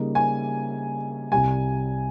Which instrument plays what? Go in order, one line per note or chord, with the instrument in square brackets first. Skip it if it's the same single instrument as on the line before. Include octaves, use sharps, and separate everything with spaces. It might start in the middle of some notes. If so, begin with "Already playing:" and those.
Already playing: [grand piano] C#3 G3 A#3 D#4
[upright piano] G#5
[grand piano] C2 C3 G3 [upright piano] G#5